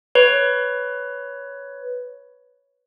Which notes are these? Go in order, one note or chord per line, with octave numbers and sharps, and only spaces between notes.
B4 C#5